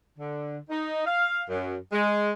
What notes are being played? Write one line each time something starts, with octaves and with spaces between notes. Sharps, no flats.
D3
D#4
F5
F#2
G#3